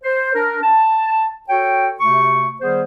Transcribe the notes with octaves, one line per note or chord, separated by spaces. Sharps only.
C5
D4 A#4
A5
F#4 A4 C#5 G5
C3 A3 F#4 C#6
D#3 G3 B3 G#4 C5